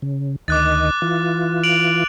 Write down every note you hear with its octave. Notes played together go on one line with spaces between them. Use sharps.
C#3
D2 D#3 D#5 D6 F#6 A6
E3 F4
D7 F7 F#7